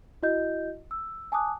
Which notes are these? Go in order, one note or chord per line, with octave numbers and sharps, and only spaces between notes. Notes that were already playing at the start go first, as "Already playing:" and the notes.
E4 F#4 D#5 G6
E6
G#5 A5 D6 D#6 F#6